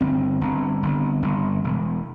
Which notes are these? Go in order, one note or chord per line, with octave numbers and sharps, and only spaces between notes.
G1 C4
G1
G1
G1
E1